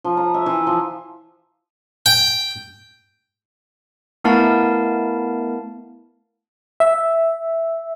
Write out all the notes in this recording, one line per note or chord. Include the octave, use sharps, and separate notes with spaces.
F3
A#5
E5
E3
F3
G5
A3 B3 E4 A#4 F5 A5
E5